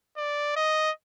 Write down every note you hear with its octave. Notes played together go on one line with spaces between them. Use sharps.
D5
D#5